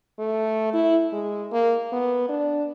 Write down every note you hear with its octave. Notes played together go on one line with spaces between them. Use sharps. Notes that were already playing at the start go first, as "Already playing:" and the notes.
A3
E4
G#3
A#3
B3
D4